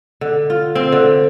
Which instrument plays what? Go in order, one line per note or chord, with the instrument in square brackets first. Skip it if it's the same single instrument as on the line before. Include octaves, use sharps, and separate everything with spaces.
[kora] D3
F4
C4
D3